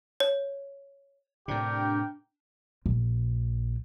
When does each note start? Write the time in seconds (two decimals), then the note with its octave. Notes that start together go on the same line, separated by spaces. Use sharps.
0.20 C#5
1.48 A2 C3 D4 G4 A#4 G5
2.86 A#1